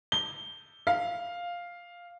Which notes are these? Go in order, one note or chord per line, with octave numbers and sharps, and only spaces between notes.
G7
F5